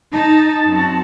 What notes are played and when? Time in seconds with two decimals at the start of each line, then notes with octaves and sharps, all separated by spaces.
0.13 D#4 A5
0.67 F#2 C4 F#4